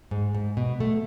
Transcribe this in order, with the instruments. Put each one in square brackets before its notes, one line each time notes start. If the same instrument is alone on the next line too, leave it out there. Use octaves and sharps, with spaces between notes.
[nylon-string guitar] G#2
G#2
B2
A3